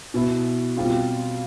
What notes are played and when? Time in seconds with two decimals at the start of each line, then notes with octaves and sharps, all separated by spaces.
0.14 B2 B3 E4
0.77 B2 G3 C4 F4